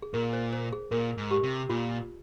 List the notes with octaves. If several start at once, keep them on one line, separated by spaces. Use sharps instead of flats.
G#4
A#2 A#4
C5
C5
G#4
A#2 A#4
G#2
G4
C3
A#2 F4